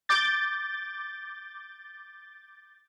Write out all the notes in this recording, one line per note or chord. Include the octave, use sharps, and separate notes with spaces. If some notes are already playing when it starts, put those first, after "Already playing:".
D6 G6 A6